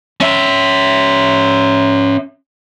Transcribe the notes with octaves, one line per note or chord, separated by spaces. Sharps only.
C#4 E5